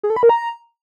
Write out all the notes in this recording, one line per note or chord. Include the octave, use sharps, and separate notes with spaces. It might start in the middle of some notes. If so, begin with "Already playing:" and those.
G#4
A4
B5
A#4
A#5